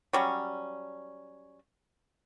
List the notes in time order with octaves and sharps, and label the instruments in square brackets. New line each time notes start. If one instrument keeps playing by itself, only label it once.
[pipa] F#3 G3 C#4